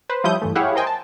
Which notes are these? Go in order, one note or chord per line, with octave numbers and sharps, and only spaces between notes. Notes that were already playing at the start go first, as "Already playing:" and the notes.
B4 C5
F3 G3 E4 C#5 D#6 G6
G2 E3 A3
E4 G4 G#4 C#5 F5 F#5
A#4 C5 D#5 G5 G#5
A5